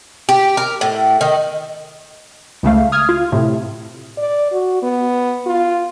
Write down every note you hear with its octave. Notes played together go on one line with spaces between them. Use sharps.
G4
A#4
A2
D#3
C#2 C#3 A3 F5
D#6 F6 G#6
F4
A2 C3
D5
F#4
B3
F4